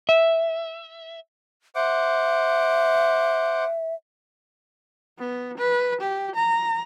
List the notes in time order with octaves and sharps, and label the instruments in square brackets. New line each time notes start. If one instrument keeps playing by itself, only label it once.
[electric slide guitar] E5
[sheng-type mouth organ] C5 F#5 D6 [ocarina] E5
[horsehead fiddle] B3
B4
G4
A#5